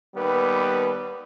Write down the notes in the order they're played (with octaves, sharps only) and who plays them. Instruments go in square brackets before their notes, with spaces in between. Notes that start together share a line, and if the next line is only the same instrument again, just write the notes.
[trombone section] D#2 G3 B3 B4